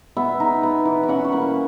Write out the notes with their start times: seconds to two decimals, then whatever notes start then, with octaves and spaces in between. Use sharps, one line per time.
0.17 B3 E5
0.40 D#4
0.63 B3
0.85 E3
1.03 E5
1.08 C#4 F#5
1.25 C#6
1.32 A#3 B5